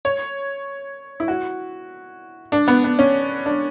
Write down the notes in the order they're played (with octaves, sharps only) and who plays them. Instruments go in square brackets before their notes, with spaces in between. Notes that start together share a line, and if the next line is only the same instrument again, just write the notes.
[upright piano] C#5
E4
F#4
D4
B3
B3
C#4
D4